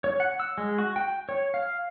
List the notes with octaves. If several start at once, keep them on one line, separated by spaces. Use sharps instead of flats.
C#5
F#5
E6
G#3
F#4
G5
C#5
F5